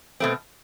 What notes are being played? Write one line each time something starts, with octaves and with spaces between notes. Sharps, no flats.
B2 A3 C4